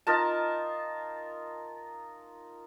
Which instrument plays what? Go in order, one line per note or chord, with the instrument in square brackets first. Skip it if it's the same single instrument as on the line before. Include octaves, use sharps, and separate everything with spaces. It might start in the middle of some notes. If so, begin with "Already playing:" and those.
[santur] D#4 F4 A#4 A5